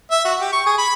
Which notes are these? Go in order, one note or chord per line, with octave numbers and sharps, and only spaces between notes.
E5
F#4
G4
C#6
G#4
B5